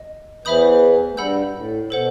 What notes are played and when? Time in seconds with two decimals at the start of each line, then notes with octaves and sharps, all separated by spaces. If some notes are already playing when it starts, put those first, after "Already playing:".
Already playing: D#5
0.45 E2 E3 C5 E5 B5 D#6 G6
1.12 A3
1.17 G2 G3 F#5 B5 E6 G6
1.54 A2
1.89 B2 A4 C5 F#5